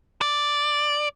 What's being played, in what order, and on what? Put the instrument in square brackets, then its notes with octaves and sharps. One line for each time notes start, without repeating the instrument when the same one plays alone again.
[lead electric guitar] D5